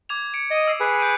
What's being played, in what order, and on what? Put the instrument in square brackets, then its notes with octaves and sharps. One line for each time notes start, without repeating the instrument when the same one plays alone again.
[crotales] D6 G#6 F7
C#7 D7
[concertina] D#5 D#6
[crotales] E6 C7
[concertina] G#4 B4
[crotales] G6 D7 D#7